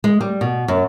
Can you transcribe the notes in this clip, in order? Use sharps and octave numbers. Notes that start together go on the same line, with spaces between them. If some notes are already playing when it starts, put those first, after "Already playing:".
G#3
G3
B2
F#2